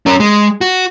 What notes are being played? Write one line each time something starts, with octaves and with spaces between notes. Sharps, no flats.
C#4 A#4
G#3
F#4